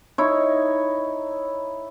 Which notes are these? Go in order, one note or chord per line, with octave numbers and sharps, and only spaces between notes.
D#4 E4 C#5